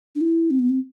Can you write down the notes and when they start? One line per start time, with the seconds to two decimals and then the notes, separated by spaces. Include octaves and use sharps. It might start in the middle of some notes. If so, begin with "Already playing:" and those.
0.15 D4
0.21 E4
0.51 C4
0.59 B3
0.69 C4